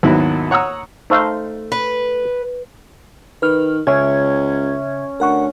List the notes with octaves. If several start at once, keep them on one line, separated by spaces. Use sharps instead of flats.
G#1 D#2 F#3 B3 E4 F#4
C#5 F#5 A#5 D#6 E6
A3 D#4 C5 F5
B4
D#3 B4 F6
C#2 C#3 C#4 E5 G#6
D2 A#4 F#5 C#6